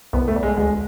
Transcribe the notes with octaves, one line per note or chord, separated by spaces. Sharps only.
C2 B3
A3
G3
G#3
D2 G#3